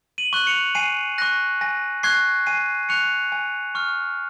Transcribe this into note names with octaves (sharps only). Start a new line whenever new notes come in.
D#7 F#7
C#6 F#6
C#7 F7
G#5 C7 D#7
C#6 F#6 A#6
G#5 A#6
C#6 F#6 G#6 C7
G#5 C7 D#7
C#6 F#6 C#7 F7
G#5
C#6 F6